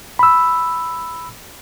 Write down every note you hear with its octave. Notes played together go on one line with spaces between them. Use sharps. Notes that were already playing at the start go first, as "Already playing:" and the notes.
B5 E6